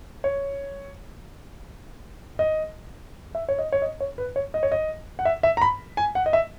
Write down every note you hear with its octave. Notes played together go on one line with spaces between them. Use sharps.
C#5
D#5
E5
C#5
D#5
C#5
D#5
C#5
B4
C#5
D#5
C#5
D#5
F#5
E5
E5
A#5
B5
G#5
F#5
D#5
E5